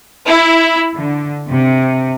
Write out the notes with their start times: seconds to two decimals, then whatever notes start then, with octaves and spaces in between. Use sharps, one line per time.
0.25 E4
0.96 D3
1.50 C3